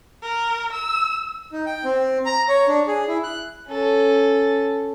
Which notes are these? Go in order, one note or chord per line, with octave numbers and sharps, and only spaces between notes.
A#4
E6
D#4
G5
C4
A#5
C#5
D4
G#4
E4
F#6
C#4 A4